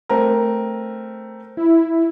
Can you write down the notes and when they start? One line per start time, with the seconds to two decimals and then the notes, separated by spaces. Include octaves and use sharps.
0.09 A3 C4 A#4
1.57 E4